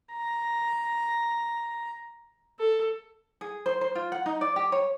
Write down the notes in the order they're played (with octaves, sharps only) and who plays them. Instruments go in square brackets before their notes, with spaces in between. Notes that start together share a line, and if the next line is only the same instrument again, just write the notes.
[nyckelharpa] A#5
A4
[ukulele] G#4
C5
C5
F4
F#5
D#4
D5
G4
C#5